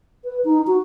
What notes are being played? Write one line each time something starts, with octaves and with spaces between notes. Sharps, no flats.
B4
D#4
F#4